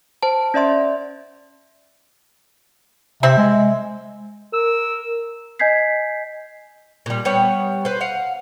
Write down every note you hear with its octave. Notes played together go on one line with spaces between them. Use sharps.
C5 A5
C#4 D5 E5 C6
C3 C4 E5
G#3
A#4 E6
D#5 G#5 G6 G#6 B6 C7
A#2 G3
G3 B3 C#5
B4 C5
F5 F#5